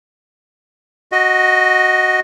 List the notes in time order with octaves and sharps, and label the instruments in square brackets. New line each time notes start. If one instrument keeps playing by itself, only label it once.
[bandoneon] F#4 D#5